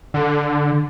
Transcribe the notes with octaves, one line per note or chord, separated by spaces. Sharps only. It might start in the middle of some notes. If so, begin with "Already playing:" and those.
D3